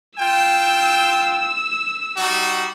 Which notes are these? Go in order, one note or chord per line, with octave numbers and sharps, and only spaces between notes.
F4 G5 E6
G3 D#4 F#4